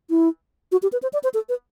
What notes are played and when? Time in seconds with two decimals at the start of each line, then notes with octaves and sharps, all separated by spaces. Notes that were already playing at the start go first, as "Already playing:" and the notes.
0.10 E4
0.72 F#4
0.83 G4
0.93 B4
1.03 C5
1.13 D5
1.24 C5
1.34 A4
1.49 B4